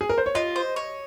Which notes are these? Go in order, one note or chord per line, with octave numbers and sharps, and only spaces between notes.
G#4
A#4
C5
C#5
F4 D#5
C5
C#5